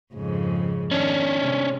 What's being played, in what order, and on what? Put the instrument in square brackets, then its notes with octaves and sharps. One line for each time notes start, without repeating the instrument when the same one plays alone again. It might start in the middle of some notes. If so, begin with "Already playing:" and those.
[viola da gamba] F2 G#2 C#3
[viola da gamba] D#3 [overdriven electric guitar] C#4 D4
[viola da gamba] C3 G#3